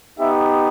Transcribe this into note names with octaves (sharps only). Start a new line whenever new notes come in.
B3 D#4 G4 E5